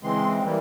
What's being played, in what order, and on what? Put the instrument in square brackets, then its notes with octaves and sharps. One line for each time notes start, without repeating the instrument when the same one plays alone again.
[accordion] C#3 E3 G#3 C4 C6
E3 G3 A#3